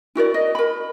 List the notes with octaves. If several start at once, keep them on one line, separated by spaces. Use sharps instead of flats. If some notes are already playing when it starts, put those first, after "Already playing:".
E4 F#4 A#4 D5
D#5
A#4 B5